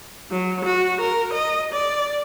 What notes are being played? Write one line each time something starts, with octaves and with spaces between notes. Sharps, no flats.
F#3
F#4
A#4
D#5
D5